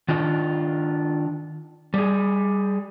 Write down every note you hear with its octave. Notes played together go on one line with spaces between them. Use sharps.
D#3 D4 F4 D#5
G3 G#4